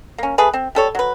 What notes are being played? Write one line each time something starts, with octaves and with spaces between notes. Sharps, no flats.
A#3 C#4
A3 G#4 B4
C4
G3 A4 C#5
F#3 B4